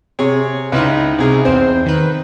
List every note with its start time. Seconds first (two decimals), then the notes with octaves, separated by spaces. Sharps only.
0.19 C3 G#4 C#5
0.72 C#2 D#4 E4 B4
1.18 C2 G#4
1.45 E2 C4 C5
1.86 D#3 B4